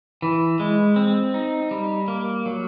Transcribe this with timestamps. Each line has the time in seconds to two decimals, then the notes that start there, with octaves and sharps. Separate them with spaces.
0.22 E3
0.60 G#3
0.96 C4
1.34 D#4
1.71 G3
2.08 A#3
2.46 F#3